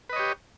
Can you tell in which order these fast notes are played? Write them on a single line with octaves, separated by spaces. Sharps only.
B4 D#5 C#5 G4